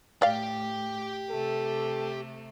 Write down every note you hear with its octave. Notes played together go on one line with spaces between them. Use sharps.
A2 G4 D5 F5 G5
C3 A3 A4